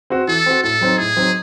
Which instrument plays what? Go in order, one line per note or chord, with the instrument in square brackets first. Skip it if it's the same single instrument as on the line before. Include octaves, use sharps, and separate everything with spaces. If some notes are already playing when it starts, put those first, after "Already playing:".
[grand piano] C4 F#4
[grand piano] E3 [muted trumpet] A4
[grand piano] C4 F#4
[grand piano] A2 [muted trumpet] A4
[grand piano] F#3 C4 D#4
[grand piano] A2 [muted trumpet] G#4
[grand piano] F#3 C4 D#4